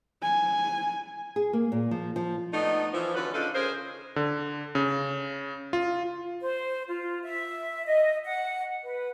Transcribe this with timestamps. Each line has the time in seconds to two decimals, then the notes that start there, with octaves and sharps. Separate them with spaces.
0.23 G#5
1.36 G#4
1.53 A#3
1.72 A#2
1.91 F3
2.16 F3
2.54 A3 B3 D4 D#4
2.93 E3 F3
3.15 D3 C#4 F#4 B4
3.34 C#3 D4 D#4 F4 A4
3.55 C#3 G#4 A#4 C5
4.16 D3
4.75 C#3
5.73 F4
6.41 C5
6.88 F4
7.23 E5
7.86 D#5
8.25 F#5
8.83 B4